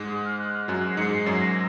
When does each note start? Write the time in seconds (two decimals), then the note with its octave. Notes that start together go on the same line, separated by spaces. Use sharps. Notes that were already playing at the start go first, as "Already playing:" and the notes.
Already playing: G#2 G#3
0.09 D#6
0.25 F6
0.39 F#6
0.53 F6
0.68 F#2 F#3 F#6
0.90 C7
0.97 G#2 G#3 C#7
1.12 C7
1.26 F#2 F#3 C7
1.41 A#6